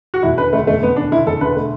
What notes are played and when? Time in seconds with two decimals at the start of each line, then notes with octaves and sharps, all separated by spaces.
0.14 F#4
0.23 E1 E4
0.38 D3 B4
0.53 D2 A3
0.67 E1 A3
0.82 E1 B3
0.96 D3 D4
1.11 D2 E4
1.26 E1 A4
1.41 D2 B4
1.56 A3